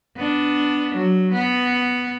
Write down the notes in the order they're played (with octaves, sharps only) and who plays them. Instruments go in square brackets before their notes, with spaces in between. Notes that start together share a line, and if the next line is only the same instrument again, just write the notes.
[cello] B3 D4
F#3
B3